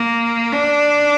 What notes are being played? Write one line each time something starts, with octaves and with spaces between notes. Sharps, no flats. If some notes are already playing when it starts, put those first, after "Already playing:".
Already playing: A#3
D4